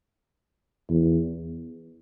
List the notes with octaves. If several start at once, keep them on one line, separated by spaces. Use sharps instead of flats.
E2